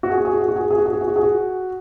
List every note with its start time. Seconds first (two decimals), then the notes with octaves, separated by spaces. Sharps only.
0.03 F#4
0.10 G#4
0.18 F#4
0.25 G#4
0.33 F#4
0.40 G#4
0.48 F#4
0.56 G#4
0.62 F#4
0.70 G#4
0.78 F#4
0.86 G#4
0.93 F#4
1.01 G#4
1.08 F#4
1.16 G#4
1.23 F#4